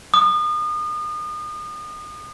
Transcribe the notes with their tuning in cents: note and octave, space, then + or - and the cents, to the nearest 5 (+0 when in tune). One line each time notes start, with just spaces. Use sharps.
D#6 -35